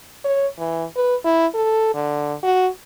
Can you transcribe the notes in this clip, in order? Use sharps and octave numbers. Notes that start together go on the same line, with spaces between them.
C#5
E3
B4
E4
A4
D3
F#4